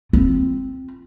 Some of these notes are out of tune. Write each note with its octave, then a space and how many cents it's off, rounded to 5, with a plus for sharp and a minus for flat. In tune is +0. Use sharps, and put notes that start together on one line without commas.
C4 +0 F4 -15